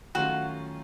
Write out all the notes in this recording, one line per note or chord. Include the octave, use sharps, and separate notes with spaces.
D#3 F#3 A3 C#4 F4 F#4